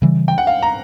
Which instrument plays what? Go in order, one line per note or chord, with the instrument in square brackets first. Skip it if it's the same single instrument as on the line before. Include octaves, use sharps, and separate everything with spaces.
[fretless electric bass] C#3 E3 G3
[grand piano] G5
F#5
F5
A#5